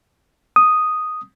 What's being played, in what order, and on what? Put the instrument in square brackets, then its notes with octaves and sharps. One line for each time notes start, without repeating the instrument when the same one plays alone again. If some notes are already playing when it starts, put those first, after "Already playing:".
[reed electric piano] D#6